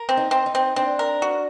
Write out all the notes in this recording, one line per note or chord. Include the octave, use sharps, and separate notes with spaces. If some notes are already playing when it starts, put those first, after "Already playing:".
Already playing: A#4
C4
D#4
C4
D#4
C4
C4 D4
A#4
F#4